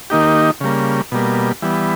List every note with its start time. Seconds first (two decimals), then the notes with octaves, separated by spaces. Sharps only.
0.10 D#3 A#3 D#4 G4
0.61 C#3 G3 A#3
1.12 B2 G3 A#3
1.62 E3 G3 B3